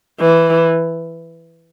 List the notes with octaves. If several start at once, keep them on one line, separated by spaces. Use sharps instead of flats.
E3